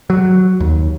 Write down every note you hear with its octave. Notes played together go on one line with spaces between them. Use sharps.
F#3
D#2